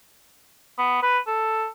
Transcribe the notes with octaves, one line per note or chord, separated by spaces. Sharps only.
B3
B4
A4